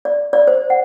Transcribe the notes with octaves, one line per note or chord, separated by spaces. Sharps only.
D5
D5
C5
F#5